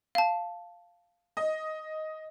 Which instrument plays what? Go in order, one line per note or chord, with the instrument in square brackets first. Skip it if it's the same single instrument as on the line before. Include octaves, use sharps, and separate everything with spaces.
[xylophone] F5 A5
[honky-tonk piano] D#5